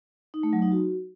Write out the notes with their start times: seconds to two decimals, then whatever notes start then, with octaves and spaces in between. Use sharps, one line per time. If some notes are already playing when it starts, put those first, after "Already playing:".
0.34 D#4
0.43 A3
0.53 F#3
0.62 D#4
0.72 F#4